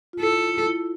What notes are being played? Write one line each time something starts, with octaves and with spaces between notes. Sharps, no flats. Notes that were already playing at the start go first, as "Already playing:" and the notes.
F4
E4 A4
E4